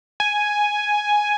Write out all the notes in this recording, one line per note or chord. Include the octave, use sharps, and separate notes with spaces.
G#5